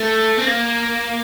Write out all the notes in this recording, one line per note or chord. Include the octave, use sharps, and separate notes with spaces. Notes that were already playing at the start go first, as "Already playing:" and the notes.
Already playing: A3
C4
A#3